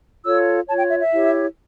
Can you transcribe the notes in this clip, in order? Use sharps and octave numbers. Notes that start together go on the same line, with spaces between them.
F4 A4 C#5 E6
F4 C#5 A5
G5
E5
E5
E4 G4 C#5